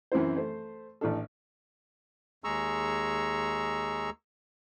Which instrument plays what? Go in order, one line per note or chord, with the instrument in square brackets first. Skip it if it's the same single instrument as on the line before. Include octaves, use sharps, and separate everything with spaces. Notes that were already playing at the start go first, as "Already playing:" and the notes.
[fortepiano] F#2 E3 C4 E4 C5
A3 C5
A1 A2 D4 A4
[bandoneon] D#2 G#3 G#4 A#5 C#6 E6